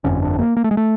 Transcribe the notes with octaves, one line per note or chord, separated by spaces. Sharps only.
G1 F2 D3 C#4
D4
A#3
A#3
A3
G#3
A3